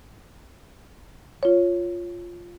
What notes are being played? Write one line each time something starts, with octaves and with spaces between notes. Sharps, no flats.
F4 C#5